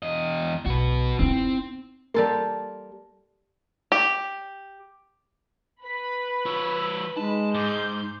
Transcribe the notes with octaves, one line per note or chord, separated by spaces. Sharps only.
E2 D#5
B1 F#4 B4
C4 D#4 E4
G3 A#3 A4 C6
G4
B4 B5 B6
F3 C#5 E6
G#3 D#4 A5
G#2 C6 D6 G6